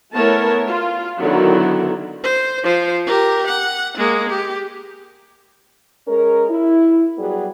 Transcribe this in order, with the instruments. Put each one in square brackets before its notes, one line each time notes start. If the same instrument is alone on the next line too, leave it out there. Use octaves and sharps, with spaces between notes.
[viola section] A3 B3 E4 A#4 C#5 A5
F4
D3 D#3 F#3 B3 E4
[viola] C5
F3 C5
G4 A#4
F#5
G#3 A#3
G4
[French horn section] G#3 C#4 A#4
E4
F#3 G3 B3 G#4